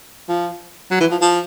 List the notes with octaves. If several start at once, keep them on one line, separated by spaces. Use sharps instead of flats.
F3
F#3
E3
F3
F3